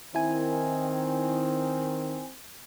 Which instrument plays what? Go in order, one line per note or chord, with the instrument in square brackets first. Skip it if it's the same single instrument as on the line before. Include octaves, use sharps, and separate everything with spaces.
[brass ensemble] D#3 [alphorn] C4 [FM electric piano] E4 G#5